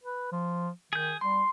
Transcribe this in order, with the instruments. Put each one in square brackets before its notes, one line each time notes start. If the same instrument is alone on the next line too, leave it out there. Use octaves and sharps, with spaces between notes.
[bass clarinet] B4
F3
[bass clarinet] D#3 [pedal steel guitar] G#4 G6
[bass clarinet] G3 [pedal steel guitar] C6